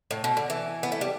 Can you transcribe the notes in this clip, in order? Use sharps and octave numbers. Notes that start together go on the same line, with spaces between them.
A2
B2
D3
E3
B3
A3
G3